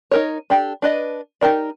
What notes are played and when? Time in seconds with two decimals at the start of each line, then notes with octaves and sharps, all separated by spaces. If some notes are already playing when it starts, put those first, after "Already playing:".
0.11 D#4 A#4 C#5
0.50 D4 G4 A4
0.82 D4 B4 D#5
1.41 D#4 G4 A#4 D5